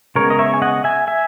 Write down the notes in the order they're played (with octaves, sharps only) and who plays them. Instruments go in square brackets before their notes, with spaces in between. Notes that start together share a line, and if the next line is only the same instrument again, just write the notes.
[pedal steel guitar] C#3 G#3 B3 A#4 C#5
D#5
C#5 E5
G#5
D#5 F#5
E5 G#5
E5 G#5